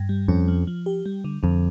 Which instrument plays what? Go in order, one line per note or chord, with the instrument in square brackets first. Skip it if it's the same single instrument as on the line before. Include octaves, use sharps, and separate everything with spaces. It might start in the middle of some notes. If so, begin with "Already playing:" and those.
Already playing: [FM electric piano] G2
G3
[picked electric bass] F2 [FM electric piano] C#4
[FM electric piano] F3
F3
G4
G3
D3
[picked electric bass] F2 [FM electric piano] D3